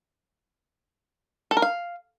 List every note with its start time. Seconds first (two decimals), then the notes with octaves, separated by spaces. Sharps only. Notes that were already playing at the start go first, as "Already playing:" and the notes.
1.51 A4
1.57 A#4
1.62 F5